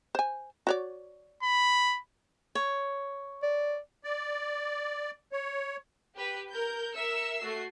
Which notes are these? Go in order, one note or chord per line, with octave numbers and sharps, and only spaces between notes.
C5 G#5
F#4 C#5 D5
B5
C#5
D5
D5
C#5
G4 B4
A#4 G6
A#4 E5 E6 C#7
A3 F#4 C7